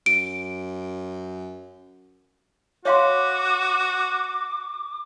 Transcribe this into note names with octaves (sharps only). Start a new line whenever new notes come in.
F#2 D7
F#4 C#5 F5 C6 D6